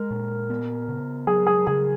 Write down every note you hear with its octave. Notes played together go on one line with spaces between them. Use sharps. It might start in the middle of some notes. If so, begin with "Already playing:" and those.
Already playing: G#3 A#4
A#2
B3
C#3
F#3 G#4
G#4
C#3 G#4